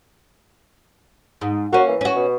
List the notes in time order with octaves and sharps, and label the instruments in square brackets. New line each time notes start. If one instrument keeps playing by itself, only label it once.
[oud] G#2
[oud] A#3 C#4 [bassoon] F#4
[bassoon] E3
[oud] C#4 F#4
[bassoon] B2